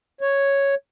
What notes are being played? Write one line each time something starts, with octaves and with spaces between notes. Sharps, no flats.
C#5